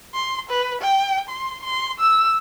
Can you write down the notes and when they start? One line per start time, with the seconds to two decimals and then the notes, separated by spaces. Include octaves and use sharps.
0.14 C6
0.50 B4
0.82 G5
1.29 C6
1.63 C6
2.00 E6